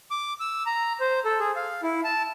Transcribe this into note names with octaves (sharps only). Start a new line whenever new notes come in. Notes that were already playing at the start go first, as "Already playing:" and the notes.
D6
E6
A#5
C5
A4
G#4
F5
E4
A5